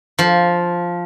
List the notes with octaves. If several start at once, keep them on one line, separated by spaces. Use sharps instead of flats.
F3